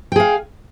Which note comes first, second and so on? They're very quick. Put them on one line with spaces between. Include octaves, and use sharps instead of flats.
G5 G#4 F5